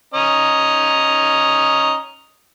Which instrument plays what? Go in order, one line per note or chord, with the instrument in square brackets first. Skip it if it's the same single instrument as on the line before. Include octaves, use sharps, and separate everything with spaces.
[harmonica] C#4 D#5 A#5